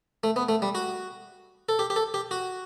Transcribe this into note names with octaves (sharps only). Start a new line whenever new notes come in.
A3
B3
A3
G3
F#4
A4
G4
G4
A4
G4
F#4